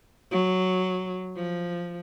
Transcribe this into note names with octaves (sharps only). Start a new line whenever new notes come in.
F#3
F3